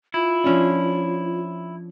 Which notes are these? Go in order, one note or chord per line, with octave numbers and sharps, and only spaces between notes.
E4 F4
F3 C#4 D4